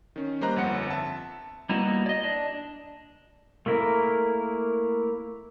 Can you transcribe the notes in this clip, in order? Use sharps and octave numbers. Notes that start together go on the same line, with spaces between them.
D#3 C#4
G3 A#3 C5 D#5 A#5 F#6
G1 F2 F#5 C#7
E5 A5
G3 A#3 B3 D#4 E4 F#4
D5 D#5
D4
A3 A#3 E4 A#4